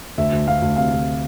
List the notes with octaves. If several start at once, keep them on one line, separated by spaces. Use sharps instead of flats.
D2 E5
D2
D2 F5
D2
C3 F5
D2